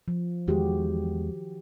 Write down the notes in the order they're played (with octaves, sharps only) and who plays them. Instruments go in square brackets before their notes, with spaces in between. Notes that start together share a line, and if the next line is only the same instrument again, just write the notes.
[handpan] F3
[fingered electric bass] E2 G#3 [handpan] D#3 F#4 G4